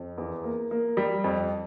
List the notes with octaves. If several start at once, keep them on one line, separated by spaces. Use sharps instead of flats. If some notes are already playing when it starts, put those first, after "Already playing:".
Already playing: F2
E2
A#3
A#3
G3
F2